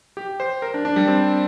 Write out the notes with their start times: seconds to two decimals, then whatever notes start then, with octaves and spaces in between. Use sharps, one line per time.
0.17 G4
0.40 C5
0.62 A#4
0.74 D4
0.85 D4
0.96 G3
1.08 C4